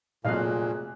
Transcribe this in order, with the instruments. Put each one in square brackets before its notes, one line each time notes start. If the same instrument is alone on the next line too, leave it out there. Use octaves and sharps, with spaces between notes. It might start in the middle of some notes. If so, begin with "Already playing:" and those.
[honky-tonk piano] F1 F#3 F#6 [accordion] A#2 [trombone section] G#3 G#4 [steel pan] D#5 F5